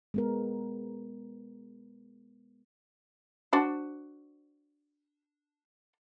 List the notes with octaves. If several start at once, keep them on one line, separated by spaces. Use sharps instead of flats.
G#3 B3 A#4
D4 F#4 C5